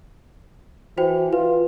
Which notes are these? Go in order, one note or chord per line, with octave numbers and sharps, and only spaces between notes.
E3 F#4 C5 G5
F4 B4